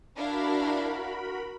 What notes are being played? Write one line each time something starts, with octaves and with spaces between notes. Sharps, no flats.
D4 E4 F#4 A#4 F5 B5